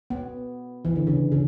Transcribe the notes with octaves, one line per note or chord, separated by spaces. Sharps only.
B3
E3
D3
C#3
C#3